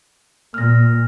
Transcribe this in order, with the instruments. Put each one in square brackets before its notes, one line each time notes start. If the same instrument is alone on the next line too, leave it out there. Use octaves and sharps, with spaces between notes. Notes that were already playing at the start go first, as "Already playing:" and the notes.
[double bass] A#2 [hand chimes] F6 A#6